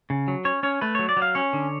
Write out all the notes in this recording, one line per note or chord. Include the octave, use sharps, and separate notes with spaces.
C#3
F#3
C#4 C#5
C#4 C#5
A3 B4
F#3 C#5
D5
F#3
F5
C#4 C#5
D3